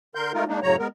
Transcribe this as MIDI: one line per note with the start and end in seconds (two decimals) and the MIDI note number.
0.15 0.32 50
0.15 0.32 70
0.15 0.32 84
0.15 0.32 91
0.34 0.44 56
0.34 0.44 57
0.34 0.44 63
0.34 0.44 65
0.34 0.44 70
0.48 0.60 56
0.48 0.60 58
0.48 0.60 62
0.48 0.60 63
0.63 0.76 42
0.63 0.76 45
0.63 0.76 49
0.63 0.76 54
0.63 0.76 73
0.63 0.76 82
0.79 0.87 56
0.79 0.87 59
0.79 0.87 70